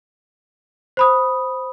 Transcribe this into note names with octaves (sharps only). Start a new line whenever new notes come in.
C5 B5 D#6